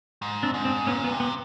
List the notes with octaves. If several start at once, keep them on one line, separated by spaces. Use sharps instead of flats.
G#2
C4 D4
G#2
C4 D4
A#2 B3 C#4
B3
C3
B3